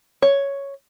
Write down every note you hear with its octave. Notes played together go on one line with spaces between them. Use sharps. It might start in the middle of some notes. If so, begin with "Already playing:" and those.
C#5